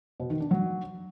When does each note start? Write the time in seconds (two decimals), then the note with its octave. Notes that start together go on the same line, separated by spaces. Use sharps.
0.20 B2
0.30 D#3
0.40 D4
0.51 F#3